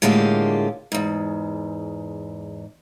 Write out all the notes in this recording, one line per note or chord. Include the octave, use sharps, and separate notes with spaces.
A2 D3 G#3 A#3 F4 G4
E2 G#2